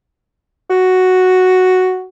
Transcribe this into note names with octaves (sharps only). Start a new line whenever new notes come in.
F#4